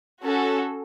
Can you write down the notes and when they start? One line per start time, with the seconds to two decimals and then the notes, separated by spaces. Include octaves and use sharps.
0.22 C#4 F#4 A4